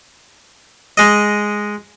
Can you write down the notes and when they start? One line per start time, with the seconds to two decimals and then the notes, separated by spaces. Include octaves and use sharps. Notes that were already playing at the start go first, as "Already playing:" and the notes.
0.97 G#3 D#5